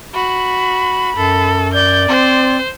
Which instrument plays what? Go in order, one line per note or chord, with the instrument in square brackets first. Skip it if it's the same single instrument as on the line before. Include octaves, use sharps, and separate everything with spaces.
[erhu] F#4 [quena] B5
[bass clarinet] F#2 [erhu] A4
[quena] D5 [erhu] G6
[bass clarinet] C4 [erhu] C5